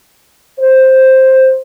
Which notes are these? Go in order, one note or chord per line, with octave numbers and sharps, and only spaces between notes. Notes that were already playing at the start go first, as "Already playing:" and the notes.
C5